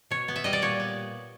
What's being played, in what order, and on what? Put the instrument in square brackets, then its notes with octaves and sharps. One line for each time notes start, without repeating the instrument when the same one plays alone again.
[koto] B2 C#5
B3
E5
G3 D#5
D5
A#2 C#5
B3